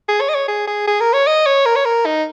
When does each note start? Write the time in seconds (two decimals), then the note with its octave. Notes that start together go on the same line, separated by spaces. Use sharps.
0.08 G#4
0.20 C#5
0.29 D#5
0.35 C#5
0.48 G#4
0.67 G#4
0.87 G#4
1.00 A#4
1.13 C#5
1.27 D#5
1.46 C#5
1.65 A#4
1.76 C#5
1.85 A#4
2.06 D#4